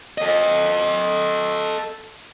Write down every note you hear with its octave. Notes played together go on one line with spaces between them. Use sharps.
A4 D#5